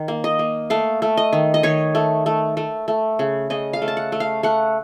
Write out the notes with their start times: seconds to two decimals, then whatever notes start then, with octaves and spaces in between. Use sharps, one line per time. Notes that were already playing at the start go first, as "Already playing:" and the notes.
Already playing: D#3
0.08 A#3
0.24 D#5
0.39 A#3
0.70 A3 F5
1.02 A3
1.17 D#5
1.33 D#3
1.54 D#5
1.63 D#3 C#5
1.95 A3
2.26 A3
2.57 A3
2.88 A3
3.19 C#3
3.50 C#3 D#5
3.73 F5
3.82 A3
3.88 A5
3.97 F#5
4.12 A3
4.20 F5
4.43 A3 F#5